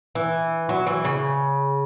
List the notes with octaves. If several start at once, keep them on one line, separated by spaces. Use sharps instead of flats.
E3
F#3
E3
C#3